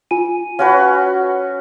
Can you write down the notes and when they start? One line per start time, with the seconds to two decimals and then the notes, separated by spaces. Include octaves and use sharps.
0.11 F4 G#5 D#7
0.59 C#4 F#4 B4 F5